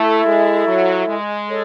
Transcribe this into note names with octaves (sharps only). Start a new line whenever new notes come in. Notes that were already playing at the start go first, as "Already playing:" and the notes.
Already playing: A3 E4 A4 E5
G#3
F#3
G#3
A4 C#5